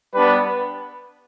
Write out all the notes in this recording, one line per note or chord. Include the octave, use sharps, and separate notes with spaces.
G3 B3 D4 B4